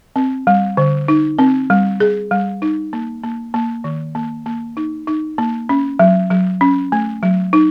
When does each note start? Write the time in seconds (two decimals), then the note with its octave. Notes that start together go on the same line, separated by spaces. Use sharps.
0.16 C4
0.47 G3
0.77 D3
1.08 D#4
1.39 C4
1.70 G3
2.00 G#4
2.31 G3
2.62 D#4
2.93 A#3
3.24 A#3
3.54 A#3
3.84 D#3
4.15 A#3
4.46 A#3
4.77 D#4
5.07 D#4
5.38 A#3
5.69 C#4
5.99 F#3
6.30 F#3
6.61 C#4
6.92 A3
7.23 F#3
7.53 D#4